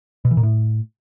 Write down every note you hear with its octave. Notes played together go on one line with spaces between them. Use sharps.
B2
E3
A#2
A2